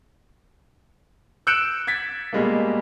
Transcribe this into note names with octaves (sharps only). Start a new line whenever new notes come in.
E6 F#6 G6 C#7 D7 E7
G#6 A6 B6
B2 G3 G#3 A#3